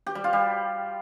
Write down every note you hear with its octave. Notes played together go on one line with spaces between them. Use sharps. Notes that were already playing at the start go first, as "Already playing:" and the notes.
G4
G3
F4
G3